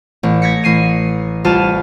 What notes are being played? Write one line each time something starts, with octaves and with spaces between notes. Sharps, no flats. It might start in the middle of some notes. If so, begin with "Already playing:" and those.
A1
G#6 A#6 B6 C#7
A1 C7 D#7
C2 F4 A5 F6 D#7